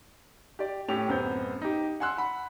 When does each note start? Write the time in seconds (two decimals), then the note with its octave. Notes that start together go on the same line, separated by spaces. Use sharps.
0.59 G4 D5
0.89 A2 C#4 G4 F7
1.07 D1 F#2 B3 C4 G6
1.62 D#4 G4
2.00 F#5 G#5 C6 E6 F#6
2.18 F#5 B5